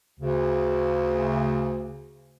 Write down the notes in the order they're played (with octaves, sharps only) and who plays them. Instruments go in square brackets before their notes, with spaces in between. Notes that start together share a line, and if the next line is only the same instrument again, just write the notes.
[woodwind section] D2 C#3